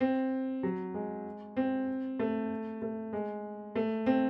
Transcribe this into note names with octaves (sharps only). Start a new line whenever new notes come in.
C4
F#3
G#3
C4
A3
A3
G#3
A3
C4